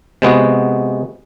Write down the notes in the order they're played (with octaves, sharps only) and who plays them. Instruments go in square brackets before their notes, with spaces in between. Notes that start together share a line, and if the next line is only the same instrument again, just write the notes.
[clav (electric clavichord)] C3 G#3 B3 F#4